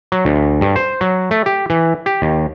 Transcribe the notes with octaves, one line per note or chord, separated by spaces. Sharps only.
F#3
D2
G2
C5
F#3
A3
G4
E3
G4
D#2